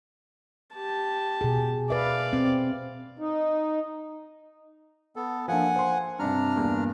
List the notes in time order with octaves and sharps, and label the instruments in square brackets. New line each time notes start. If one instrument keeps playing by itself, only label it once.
[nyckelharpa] G4 A5
[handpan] B2 G#4
[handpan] B4 E5 [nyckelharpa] D5 F5
[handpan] C4
[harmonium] D#4
[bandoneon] B3 A4
[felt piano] F3 A#3 D4 [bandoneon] F#5 G#5
[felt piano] C5 C6
[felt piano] G2 C3 [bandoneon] D4 A#5 F6
[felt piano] E2 G2 A#2